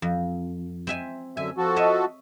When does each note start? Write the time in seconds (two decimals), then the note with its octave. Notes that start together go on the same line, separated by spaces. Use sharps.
0.02 F2
0.87 C4 E5 G#5
1.37 F#2 D3 E5 G#5
1.57 F3 F#4 A4
1.76 C#5 D#5 E5